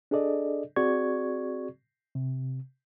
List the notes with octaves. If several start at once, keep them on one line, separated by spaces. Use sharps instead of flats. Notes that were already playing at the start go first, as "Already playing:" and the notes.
D4 G#4 A4 D5 D#5
C4 F#4 G#4 D5 C#6 G#6
C3